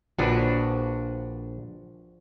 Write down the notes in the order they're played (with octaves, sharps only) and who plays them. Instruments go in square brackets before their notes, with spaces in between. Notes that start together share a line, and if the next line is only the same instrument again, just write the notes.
[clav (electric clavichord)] A#1 B4 [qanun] F3 D4 F#4